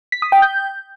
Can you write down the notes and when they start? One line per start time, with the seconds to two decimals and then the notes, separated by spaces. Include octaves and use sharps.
0.12 B6
0.22 D#6
0.32 G5
0.42 G6